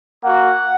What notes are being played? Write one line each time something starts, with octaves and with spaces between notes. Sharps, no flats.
A#3 F#4 F#5